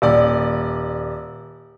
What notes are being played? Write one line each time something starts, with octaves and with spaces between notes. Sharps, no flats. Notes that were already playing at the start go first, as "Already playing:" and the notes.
D#1 D5